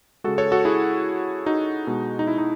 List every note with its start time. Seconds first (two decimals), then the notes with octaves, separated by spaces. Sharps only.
0.24 C#3 G#3 F#4 A4
0.38 A4 C#5
0.52 F#4 A4
0.65 E4 G#4
1.46 D#4 F#4
1.87 B2 G#3
2.19 D#4
2.27 E4
2.38 D#4